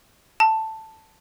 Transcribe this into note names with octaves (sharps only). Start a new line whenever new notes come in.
A5